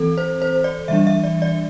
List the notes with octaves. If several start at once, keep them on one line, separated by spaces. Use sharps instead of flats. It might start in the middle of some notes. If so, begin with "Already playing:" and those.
Already playing: E3 C4 A4
C5
C5
D5
E3 G3 D4 E5
E5
D5
D5